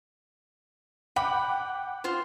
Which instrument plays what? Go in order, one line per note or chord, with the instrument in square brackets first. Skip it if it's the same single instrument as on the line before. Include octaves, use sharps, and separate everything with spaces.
[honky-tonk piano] F#5 G5 D6 [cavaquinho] B5
[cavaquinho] F4 C5